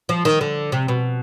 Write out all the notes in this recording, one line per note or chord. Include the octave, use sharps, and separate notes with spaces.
F3
D#3
D3
C3
B2